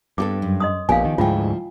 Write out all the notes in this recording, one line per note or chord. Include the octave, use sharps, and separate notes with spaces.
G2 B3 G4 A4 D6
F#2
D#5 C6 D#6
A#1 A#2 F3 B3 G4 F5 G#5
D#3
D2 G#2 F3 G#3 E4 F4 G5